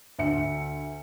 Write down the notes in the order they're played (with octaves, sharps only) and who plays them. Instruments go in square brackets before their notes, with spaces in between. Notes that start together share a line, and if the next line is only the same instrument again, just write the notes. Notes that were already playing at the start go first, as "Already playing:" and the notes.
[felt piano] D2 E5 C#7